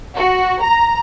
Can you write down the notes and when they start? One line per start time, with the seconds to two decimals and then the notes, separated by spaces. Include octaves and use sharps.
0.16 F#4
0.62 A#5